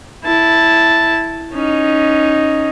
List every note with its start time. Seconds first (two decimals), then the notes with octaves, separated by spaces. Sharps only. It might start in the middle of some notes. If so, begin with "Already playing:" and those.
0.24 E4 A5
1.53 C#4 D#4